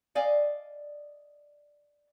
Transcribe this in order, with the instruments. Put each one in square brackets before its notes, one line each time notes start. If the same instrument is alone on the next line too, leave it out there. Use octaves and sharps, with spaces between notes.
[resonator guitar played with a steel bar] D5 D#5 F5 G#5